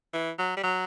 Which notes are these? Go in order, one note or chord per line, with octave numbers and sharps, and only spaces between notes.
E3
F#3
G3
F#3